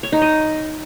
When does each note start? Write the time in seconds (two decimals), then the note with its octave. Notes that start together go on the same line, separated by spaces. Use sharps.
0.03 C#5
0.12 D#4
0.22 D#5